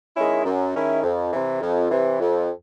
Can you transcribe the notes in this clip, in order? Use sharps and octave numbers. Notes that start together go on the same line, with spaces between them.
D#3 G#3 C#4 E4
F#2
D#3 G#3 C#4 E4
F2
C3 E3
F2
C3 E3
F2